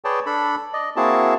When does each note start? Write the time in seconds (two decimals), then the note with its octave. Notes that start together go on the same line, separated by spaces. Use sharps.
0.05 G#4 B4 C#5 D5 G5 A5
0.26 D4 A4 B5
0.73 D5 D#5
0.96 A#3 C4 E4 F#4 G#4 A5